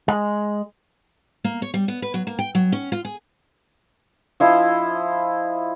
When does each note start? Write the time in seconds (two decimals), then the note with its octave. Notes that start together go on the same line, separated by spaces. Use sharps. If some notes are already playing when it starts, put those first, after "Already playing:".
0.08 G#3
1.44 A#3
1.62 C#5
1.74 G3
1.88 B3
2.02 B4
2.14 F#3
2.27 A#3
2.39 G5
2.55 F#3
2.72 C#4
2.92 F4
3.05 G#4
4.40 F3 E4 D#5 F5